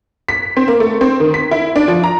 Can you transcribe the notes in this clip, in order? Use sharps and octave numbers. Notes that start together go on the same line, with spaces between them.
B6
C4
A#3
A3
C4
D#3
B6
E4
D4
F3
A#5